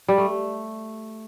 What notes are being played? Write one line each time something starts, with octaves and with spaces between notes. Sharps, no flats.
G3
A3